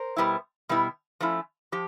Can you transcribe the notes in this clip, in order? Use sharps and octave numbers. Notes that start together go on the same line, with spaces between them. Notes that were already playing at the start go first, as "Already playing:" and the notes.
Already playing: A#4 C5
B2 G3 B3 E4
B2 G3 B3 E4
F3 A3 C#4 E4
F3 G4